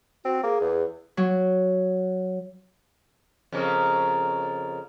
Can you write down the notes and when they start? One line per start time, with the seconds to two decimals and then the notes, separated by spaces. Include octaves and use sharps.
0.25 C4 F#4
0.43 A#3 G#4
0.61 E2
1.17 F#3
3.52 F2 C#3 A#3